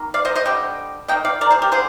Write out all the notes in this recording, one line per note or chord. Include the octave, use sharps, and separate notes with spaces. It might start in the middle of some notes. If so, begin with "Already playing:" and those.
Already playing: D#3 A#3
D5 F5
C5 D#5
C5 D#5
D3 G3 G5
D#3 A#3 D#5 G5
D5 F5
A#4 D5
G#4 C5
G4 A#4
D3 G#4 C5